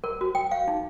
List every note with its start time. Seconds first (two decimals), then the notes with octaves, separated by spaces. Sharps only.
0.04 A#4
0.21 F#4
0.35 G5
0.51 F5
0.68 D#4